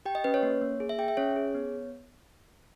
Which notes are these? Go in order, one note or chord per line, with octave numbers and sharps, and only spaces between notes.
G4 G5
D#5
C#4 B4
C#5
A#3
A#3
G#4
E5
G#4 G5
E5
C#4 C#5
G#4
B3